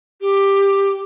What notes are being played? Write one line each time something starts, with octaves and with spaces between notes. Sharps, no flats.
G4